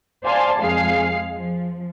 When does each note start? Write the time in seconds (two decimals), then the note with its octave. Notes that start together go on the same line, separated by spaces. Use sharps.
0.25 C5 D5 F5 G#5 A5 C6
0.61 F2 G#3 G#4 F5 C7
1.37 F3